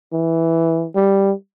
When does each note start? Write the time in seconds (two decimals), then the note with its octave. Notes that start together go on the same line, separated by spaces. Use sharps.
0.12 E3
0.95 G3